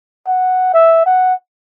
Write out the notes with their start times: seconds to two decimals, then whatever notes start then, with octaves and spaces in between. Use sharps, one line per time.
0.27 F#5
0.73 E5
1.06 F#5